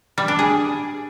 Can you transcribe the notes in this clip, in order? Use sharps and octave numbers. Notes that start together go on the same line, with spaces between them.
G3
D4
G#4